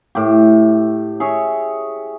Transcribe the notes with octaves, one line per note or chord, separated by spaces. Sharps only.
A2 G4
G#4 C#5 E5